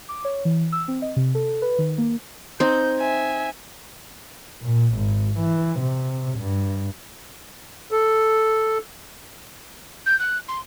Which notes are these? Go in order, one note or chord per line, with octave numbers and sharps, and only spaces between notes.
D6
C#5
E3
E6
C4
D#5
C3
A4
B4
D#3
A#3
C4 D#4 G6
E5 G#5
A#2
G#1
E3
C3
G2
A4
G6
F#6
C6